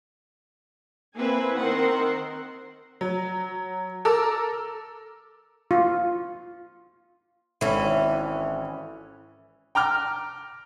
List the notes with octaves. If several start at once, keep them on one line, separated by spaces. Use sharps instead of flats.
A#3 C4 E4 B4 G#5
D#3 C4 A#4 F#5 C6
F#3
A4 A#4 D6 E6
F4
G#1 E3 C#4 A4
G5 A#5 D6 F6